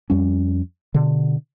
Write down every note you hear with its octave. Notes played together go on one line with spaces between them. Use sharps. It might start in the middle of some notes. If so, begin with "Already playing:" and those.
F2 G3 C#4
B2 D3